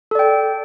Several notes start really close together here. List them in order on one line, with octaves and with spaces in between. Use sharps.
A4 D5 G5